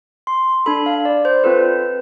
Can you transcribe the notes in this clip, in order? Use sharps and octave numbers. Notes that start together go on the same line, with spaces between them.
C6
D4 A4 B5
F5
D5
C5
C4 F4 A4 B4